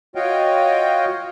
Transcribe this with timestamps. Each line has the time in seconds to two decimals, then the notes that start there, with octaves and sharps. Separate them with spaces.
0.15 F4 F#4 C#5 D#5 F5 G5